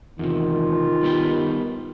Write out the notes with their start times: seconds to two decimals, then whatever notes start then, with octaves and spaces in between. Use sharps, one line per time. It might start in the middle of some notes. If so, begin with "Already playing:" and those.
0.19 E2 C3 D#3 F4
1.03 G3 B3 G4